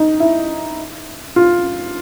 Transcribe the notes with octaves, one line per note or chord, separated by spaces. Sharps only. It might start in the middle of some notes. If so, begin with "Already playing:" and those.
Already playing: D#4
E4
F4